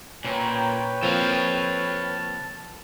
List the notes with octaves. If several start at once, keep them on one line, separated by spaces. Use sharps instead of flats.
A#2 C#4 B4 C#5 G5
F3 A#3 C4 A4 F5